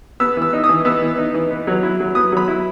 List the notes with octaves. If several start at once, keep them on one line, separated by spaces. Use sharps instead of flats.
B3 E6
E3 E6
D#4
D#6
E3
B3 E6
E3
D#4
E3
B3
F#3
E4
F#3
B3 D#6
F#3 B5
E4